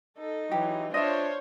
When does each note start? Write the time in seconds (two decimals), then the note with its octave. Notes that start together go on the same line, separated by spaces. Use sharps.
0.19 D#4 A4
0.51 E3 F#3 G4
0.94 D4 F4 C5 C#5 D#5 E5